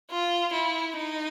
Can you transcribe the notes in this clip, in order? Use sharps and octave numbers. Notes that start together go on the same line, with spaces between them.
F4
E4
D#4